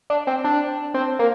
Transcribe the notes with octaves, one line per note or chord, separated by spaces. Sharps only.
D4
C4
D4
C4
A#3